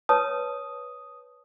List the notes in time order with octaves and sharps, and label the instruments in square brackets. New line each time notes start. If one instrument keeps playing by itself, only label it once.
[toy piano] B4 C#5 A5 [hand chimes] D#6